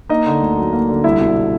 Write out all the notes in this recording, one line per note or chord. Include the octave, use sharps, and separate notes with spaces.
A#3 D#4 D#5
D3
D2
F#3
A#3
D3
C2 E4 E5
B2